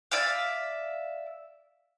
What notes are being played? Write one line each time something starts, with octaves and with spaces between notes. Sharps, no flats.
D5 E5 F5